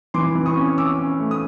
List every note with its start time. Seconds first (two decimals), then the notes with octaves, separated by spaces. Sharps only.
0.14 E3 C6 D6
0.35 E3
0.46 C#6 D#6
0.57 C#4
0.78 C#4 D6 E6
0.99 C#4
1.20 A3
1.31 D#6